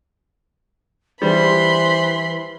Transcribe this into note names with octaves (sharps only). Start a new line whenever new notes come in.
E3 G3 C5 B5 C6